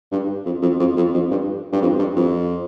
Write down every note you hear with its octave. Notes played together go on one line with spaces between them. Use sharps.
G2
F2
F2
F2
F2
F2
G2
G2
F2
G2
F2